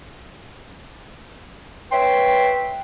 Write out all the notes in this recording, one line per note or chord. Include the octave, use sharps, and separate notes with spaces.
B4 C#5 E5 G5 C6